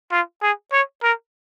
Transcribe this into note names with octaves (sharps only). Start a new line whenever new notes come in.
F4
G#4
C#5
A#4